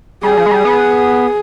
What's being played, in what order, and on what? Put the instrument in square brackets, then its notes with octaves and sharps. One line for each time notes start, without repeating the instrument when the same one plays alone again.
[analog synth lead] G3 [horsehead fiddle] G#4
[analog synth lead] F3
G#3
G3
B3